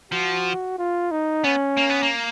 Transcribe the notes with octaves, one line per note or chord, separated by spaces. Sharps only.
F3 F#4
F4
D#4
B3 C#4
A#3
B3
A#3